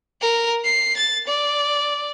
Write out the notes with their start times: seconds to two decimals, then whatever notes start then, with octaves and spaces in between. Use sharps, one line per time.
0.21 A#4
0.64 C7
0.97 A6
1.27 D5